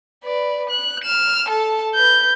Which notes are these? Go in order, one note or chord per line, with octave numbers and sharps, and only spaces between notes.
B4 D5
F#6
F6 E7
A4 A5
B4 G6